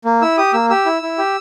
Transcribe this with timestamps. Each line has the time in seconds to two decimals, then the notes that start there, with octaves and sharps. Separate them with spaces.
0.05 A#3
0.22 E4 E6
0.38 G4 D#6
0.53 A#3 E6
0.70 G4 E6
0.86 E4
1.02 E4
1.18 G4